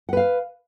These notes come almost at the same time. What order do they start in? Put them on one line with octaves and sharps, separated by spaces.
F#5 B4 F5